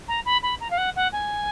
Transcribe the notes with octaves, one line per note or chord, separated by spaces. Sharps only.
A#5
B5
B5
A#5
F5
F#5
F#5
G#5